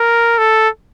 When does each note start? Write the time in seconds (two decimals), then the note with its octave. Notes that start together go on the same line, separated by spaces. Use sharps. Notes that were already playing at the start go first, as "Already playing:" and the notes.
Already playing: A#4
0.38 A4